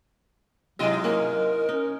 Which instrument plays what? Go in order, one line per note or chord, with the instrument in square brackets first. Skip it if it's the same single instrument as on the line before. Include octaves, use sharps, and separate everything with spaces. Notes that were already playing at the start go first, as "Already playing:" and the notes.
[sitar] G#2 E4 D#5 [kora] C3 G#3 [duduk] F#3
[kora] A#3 C#4 F#5 [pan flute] A#4
[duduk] C#4 [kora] D#4